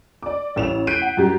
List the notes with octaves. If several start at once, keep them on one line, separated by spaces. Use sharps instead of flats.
D5 D6
A1 E7 F7
F#6 G6 B6 C7 D7 D#7
F#5
F#2 G4